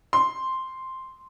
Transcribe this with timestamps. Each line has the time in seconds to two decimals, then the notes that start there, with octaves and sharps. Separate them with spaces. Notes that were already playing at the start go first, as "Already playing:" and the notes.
0.13 C6